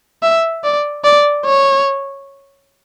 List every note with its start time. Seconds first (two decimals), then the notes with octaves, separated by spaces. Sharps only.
0.23 E5
0.64 D5
1.04 D5
1.46 C#5